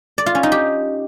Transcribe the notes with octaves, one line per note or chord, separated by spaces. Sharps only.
D5
F4
C#4
D#4
G4